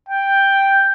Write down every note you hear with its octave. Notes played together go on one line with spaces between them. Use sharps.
G5